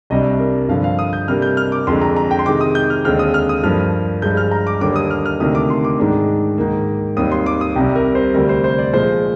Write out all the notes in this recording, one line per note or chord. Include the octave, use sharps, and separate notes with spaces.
C2 C3 G3 D4 D#5
A#4
G2 D3 F3 F5
F5
D#6
G6
C3 G3 A#3 D4 F6
G6
F6
D6
F2 D3 G#3 D4 C6
A#5
A#5
G5
C6
C3 D#3 G#3 D6
D#6
G6
F6
D#2 D3 G#3 C4 F6
D#6
F6
D#6
G2 F3 A#3 F6
G2 F3 G#3 G6
F6
A#5
D6
D#2 D3 G3 A#3 D4 D6
D#6
F6
F6
D2 C3 D#3 A#3 D4 D#6
D6
C6
D6
G#2 D#3 G#3 D4
G#2 D#3 A#3
D#2 D#3 G3 C4 D#6
C6
D6
D#6
C2 C3 G3 G5
A#4
C5
D2 C3 G3 A#4
C5
C5
D5
A#2 F3 G#3 C5